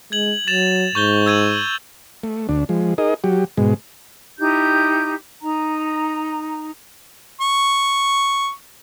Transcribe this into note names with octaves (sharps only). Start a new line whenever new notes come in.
G#3 G#6 F#7
F#3 A6 E7 F7
G#2 C#6 G6 G7
E6 G#6 D#7
A3
D2 D4
F3 G#3
D#4 G#4 A#4 D#5
F#3 G4
G#2 B2 G#3
D#4 E4 G4 G6
D#4 A#5
C#6